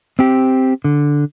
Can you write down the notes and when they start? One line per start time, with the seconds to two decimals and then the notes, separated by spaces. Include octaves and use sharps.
0.19 C4 G4
0.84 D3